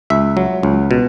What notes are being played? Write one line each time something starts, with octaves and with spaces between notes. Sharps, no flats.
C#2 E5
F#3
C#2
B2